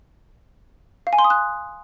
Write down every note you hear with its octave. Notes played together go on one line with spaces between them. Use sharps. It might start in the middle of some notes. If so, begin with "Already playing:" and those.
F5
G#5
C6
D#6
F#6